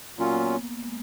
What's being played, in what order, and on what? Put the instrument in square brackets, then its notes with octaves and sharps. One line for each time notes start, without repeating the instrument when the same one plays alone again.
[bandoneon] A#2 F#3 C#4 F4 [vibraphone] A#3
[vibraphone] B3
A#3
B3
A#3
A#3
G#3